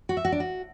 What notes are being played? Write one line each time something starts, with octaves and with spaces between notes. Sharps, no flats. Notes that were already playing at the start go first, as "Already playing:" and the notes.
F#4
E5
F#4
D4
F#4